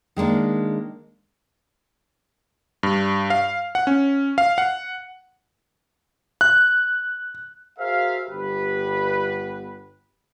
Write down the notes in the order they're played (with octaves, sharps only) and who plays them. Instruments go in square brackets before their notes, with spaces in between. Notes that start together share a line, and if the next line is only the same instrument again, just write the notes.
[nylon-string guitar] D#3 G#3 A#3 D4
[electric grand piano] G2
F5
F#5
C#4
F5
F#5
F#6
[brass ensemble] F#4 G#4 A#4 C5 E5 F5
G1 G2 B3 G4 B4